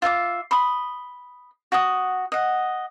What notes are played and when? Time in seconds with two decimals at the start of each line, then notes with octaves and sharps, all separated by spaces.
0.02 F4 E5 F5 D6
0.51 B5 C6 D#6
1.72 F#4 F#5 D#6
2.32 D#5 F#5